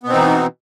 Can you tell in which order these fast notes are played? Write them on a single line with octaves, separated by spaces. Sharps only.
B3 B2 C4 D#4 E3